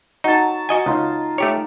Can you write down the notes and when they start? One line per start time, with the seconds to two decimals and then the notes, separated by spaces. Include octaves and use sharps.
0.24 F#3 D#4 A5
0.69 F#4 D#5 G#5
0.86 C#2 D#4 F4
1.38 A3 G4 C#5